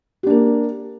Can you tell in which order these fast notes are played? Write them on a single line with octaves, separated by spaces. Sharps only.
G4 D4 A#3